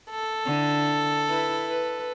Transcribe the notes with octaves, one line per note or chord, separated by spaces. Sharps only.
A4
D3 E4
E4 B4
B4